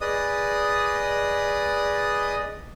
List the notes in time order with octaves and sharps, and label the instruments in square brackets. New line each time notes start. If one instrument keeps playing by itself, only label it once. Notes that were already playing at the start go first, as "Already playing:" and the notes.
[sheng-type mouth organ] G#4 B4 D5 D#5 D#6